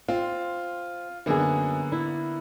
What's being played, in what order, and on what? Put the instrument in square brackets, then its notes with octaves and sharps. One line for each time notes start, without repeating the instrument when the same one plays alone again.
[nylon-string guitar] C4 [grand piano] F4
[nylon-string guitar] F#2 G#4 [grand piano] D3 A#3 B3
[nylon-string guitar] E4